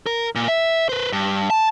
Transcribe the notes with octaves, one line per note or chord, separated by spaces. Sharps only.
A#4
A#2
E5
B4 C5
G2
A5